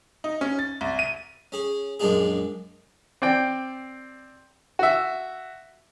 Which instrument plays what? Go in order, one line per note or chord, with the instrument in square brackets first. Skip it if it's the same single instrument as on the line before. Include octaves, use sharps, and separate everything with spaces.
[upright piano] D#4
C#4
A6
C2
D#7
[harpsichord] C#4 G#4
A#1 F#2 G#3 D4 F4 G#4
[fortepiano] C4 D5 G5
F#4 E5